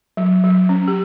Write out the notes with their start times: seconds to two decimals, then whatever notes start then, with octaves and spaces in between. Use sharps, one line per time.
0.17 F#3
0.44 F#3
0.69 C#4
0.88 G4